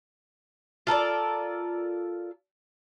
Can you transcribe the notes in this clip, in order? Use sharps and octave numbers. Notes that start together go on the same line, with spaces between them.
F4 A4 A#4 D5